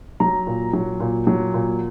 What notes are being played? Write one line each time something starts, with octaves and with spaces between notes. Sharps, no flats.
F#3 A#5
A#2
F#3
A#2
F#3
A#2